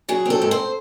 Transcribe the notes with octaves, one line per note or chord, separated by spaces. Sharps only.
F#3 G#4
C4 A4
G#2
C5